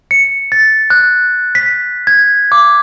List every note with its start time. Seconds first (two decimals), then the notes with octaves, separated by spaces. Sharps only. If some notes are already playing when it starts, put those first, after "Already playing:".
0.11 C#7
0.52 A6
0.90 F#6
1.55 B6
2.07 G#6
2.52 D6